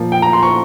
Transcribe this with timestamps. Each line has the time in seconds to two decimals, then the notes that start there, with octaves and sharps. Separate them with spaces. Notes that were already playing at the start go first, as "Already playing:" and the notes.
Already playing: A#2 F3 A#3
0.12 G5
0.22 A#5
0.33 C6
0.43 C#6